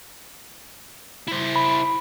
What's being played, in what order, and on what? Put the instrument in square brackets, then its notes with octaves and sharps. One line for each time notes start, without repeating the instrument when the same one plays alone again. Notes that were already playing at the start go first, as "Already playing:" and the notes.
[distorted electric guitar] E4 C5
[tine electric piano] B5